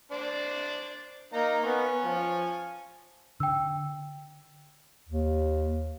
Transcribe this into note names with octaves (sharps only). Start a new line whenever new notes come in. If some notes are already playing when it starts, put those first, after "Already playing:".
D4 C5 D5
A#3 D#4 A#5
B3 G#5 C#6
F3
D3 G5 E6
D#2